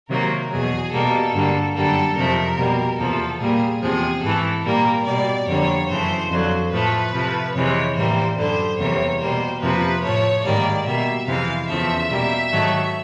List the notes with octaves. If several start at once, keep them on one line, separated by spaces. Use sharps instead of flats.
C3 D#3 F#3 A#3 A#4
E2 B2 F#3 G#4
B2 G3 A#3 A4
G2 D3 G3 A#3
F#2 D3 G3 A#3 A4
F2 C3 F3 A3 A#4
B2 G3 A#3
E2 C3 F3 A#3 A4
A#2 G3 A#3 G#4
E2 C3 F3 G#4
G#2 E3 A3 A4
A#2 G3 A#3 A#4
B2 G3 A#3 D5
F2 D3 G3 A#3 C#5
F#2 C#3 E3 A3 C5
F2 D3 F#3 C5
A2 F3 A3 B4
C3 F3 A3
F2 C3 E3 G#3 C#5
A2 E3 G3 A#3 C5
F#2 D3 G3 C5
E2 C3 E3 G3 A#3 C#5
B2 G3 A#3 C5
F2 C3 F3 A#3 B4
A2 F3 A3 C#5
G#2 D#3 G3 A#3 D5
B2 G3 A#3 E5
F2 C3 E3 G#3 F5
E2 C#3 F3 A3 E5
B2 G3 A#3
G#2 D#3 F#3 A3